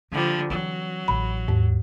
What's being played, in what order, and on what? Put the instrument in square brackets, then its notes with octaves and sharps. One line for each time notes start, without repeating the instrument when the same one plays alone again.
[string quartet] D3 F3 G3 [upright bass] A#3
[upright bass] E3 C4 [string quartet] F#3
[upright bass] A1 D3 [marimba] B5
[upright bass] D#2 [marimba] G#2